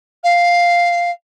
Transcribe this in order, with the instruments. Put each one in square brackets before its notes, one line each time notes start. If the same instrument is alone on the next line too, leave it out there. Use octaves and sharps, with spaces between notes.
[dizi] F5